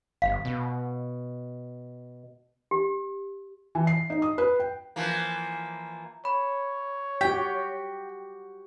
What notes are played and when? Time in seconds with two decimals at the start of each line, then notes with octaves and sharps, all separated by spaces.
0.22 G1 F5
0.45 B2
2.71 G4
3.75 E3
3.87 C7
4.10 D#4
4.22 D#6
4.38 B4
4.60 G5
4.96 E3 F3 A#3
6.25 C#5 B5
7.21 F#4 G4 G5 B6